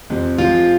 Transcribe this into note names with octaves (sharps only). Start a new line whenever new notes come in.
F2 C3 F3 C4
C3 F3 G#3 F4